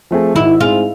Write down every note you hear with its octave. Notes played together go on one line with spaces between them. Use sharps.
F3 A3 C4 G#4
G#1 E4
G#2 G#3 C4 F4 G#4